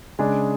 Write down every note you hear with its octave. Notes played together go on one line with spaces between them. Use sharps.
C#3 G#3 D4 G#4